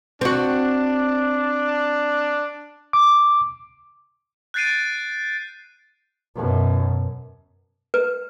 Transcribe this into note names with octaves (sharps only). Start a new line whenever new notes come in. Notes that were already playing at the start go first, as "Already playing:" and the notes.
C4 D4 F#4
D6
F#6 G6 A6 C7 D7 D#7
F#2 B2
B4